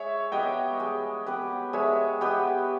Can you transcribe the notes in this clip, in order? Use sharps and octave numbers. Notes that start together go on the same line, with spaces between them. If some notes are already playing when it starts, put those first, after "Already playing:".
Already playing: G#3 C#5 E5
B3 G4 B4 D#5 G5
G#3
B3 G4 B4
G#3 C#5 E5
B3 G4 B4 D#5 G5